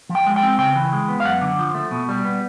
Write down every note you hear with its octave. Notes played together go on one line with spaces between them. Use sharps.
F3
G5
G#3
G5
C4
C#3 G5
E3
G#3
B3
F5
F#2 F#5
D3
F3
A3
B2
G3
B3